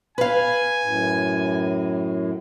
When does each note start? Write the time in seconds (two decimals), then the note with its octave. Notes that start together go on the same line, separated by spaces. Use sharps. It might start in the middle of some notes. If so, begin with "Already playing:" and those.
0.18 B4 F5 G#5
0.81 F#2 A2